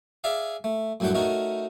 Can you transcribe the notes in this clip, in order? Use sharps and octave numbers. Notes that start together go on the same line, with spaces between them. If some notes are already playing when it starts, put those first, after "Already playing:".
G#4 D5 E5 F5
A3
F#2 A2 G3 D4 F#5 G5
A3 C#4 D#4 F#4 A#4